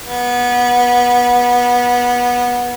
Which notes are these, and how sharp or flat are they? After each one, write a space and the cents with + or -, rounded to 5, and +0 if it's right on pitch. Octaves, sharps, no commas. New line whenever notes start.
B3 -20